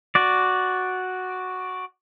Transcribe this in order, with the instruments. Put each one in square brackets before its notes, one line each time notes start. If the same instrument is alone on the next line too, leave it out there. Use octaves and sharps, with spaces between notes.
[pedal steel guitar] F#4 D5